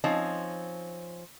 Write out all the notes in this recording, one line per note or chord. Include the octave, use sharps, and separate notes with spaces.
F3 C4 C#4 D#4